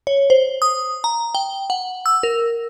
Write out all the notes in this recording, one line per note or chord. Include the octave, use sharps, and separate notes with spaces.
C#5
C5
D#6
A#5
G5
F#5
E6
A#4